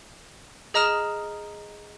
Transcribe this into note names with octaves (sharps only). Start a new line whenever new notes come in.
G#4 D#5 A#5 D#6 F6 E7